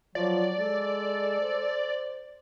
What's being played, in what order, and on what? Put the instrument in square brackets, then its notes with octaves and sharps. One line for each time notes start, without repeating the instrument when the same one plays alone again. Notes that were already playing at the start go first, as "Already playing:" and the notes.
[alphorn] F3 [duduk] F#3 [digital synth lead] D5
[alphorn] G#3 [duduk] A4
[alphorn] C5